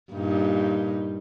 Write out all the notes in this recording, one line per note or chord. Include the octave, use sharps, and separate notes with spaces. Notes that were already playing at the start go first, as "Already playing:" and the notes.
G2 A#2 D#4